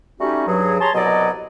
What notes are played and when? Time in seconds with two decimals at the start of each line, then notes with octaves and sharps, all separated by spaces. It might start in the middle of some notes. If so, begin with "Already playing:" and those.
0.20 G3 A3 C#4 D#4 F#4 G4
0.47 G2 F#3 G#4
0.81 G#4 C#5 A5 A#5 C6
0.94 C2 B2 F#3 D5 D#5